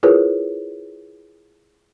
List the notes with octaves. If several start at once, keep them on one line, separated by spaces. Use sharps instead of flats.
E4 F4 G#4 A#4 B4 C#5